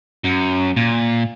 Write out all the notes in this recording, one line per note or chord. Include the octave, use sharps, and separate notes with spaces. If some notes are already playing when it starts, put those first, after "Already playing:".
F#2
A#2